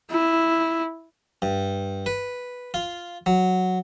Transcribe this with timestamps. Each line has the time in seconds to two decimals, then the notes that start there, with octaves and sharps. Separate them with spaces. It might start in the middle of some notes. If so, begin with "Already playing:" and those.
0.11 E4
1.42 G2
2.06 B4
2.74 F4
3.26 F#3